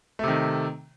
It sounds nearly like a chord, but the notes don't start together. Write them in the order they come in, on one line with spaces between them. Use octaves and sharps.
A3 C3 D#3